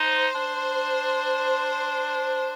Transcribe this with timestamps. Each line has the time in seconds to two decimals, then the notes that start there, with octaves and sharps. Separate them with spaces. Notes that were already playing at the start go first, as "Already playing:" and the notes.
Already playing: D#4 C5
0.35 D4